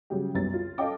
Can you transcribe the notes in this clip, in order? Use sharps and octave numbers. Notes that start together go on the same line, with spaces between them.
C#3 F#3 G3 G4
C2 F#2 G3 B3 A6
F4
A4 D#5 F5 G5 D6